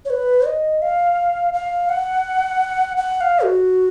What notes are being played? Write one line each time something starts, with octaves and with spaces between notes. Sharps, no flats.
C#5
B4
D#5
F5
F5
F#5
F#5
F5
F#4